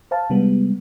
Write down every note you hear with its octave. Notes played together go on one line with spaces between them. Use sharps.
C5 F5 A5
C3 G3 G#3 B3